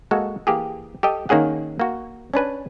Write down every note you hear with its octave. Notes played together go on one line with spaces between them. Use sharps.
G#3 A#3 F#4 A4
E3 A#3 G4 G#4
G4 A4 D#5 G5
D#3 A#3 C#4 G#4 F#5
A#3 F#4
C#4 D4 B4 G#5